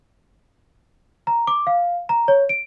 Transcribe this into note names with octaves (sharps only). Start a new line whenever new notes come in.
A#5
D6
F5
A#5
C#5
D7